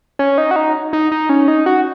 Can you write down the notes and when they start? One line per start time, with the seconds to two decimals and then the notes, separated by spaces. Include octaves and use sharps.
0.19 C#4
0.38 D#4
0.51 F#4
0.56 D#4
0.93 D#4
1.12 D#4
1.29 C#4
1.48 D#4
1.66 F#4